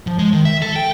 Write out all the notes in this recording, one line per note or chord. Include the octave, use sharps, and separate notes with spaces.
F3
G#3
D#3
E5
A4
G5